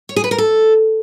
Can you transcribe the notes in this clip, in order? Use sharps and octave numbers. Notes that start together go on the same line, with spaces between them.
C#5
G#4
B4
A#4
A4